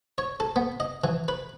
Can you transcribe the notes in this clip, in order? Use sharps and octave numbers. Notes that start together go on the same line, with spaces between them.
C#5
A4
B3
D#5
E3
B4